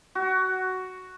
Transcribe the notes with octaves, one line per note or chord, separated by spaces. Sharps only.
F#4